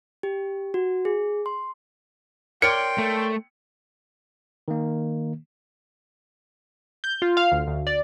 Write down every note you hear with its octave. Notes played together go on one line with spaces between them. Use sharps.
G4
F#4
G#4
C6
A#4 C#5 D5 G5 C6 C#7
A3
D#3 A#3
G6
F4
F5
D2
D2
D5